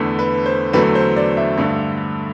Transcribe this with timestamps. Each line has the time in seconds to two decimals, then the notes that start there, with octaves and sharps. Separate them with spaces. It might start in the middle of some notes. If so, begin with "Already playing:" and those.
Already playing: E2 D3 A3
0.19 B4
0.46 C5
0.73 E2 D3 F#3 A3 B4
0.95 C5
1.16 D5
1.37 E5
1.58 G2 D3 A3